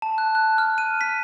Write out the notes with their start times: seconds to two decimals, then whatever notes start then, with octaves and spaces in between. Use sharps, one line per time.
0.02 A5
0.18 F#6
0.35 F#6
0.58 F6
0.78 D#7
1.01 B6